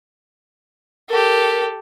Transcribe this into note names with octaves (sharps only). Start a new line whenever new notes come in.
G4 A4 A#4